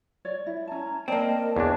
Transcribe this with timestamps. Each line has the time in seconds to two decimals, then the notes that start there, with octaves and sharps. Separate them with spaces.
0.25 C#5 D5
0.47 E4
0.67 C#4 A5 A#5
1.08 A#3 C4 A#4 D5 D#5 A5 B5
1.57 E2 D4 C#5 A5